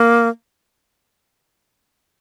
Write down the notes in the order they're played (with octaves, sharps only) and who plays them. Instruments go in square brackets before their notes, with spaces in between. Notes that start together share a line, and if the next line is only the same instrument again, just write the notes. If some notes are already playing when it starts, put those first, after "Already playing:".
Already playing: [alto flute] A#3